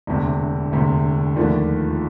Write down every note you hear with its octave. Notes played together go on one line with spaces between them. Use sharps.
E1 D2 C3
E1 D2 C3
D#2 D3 F3 A3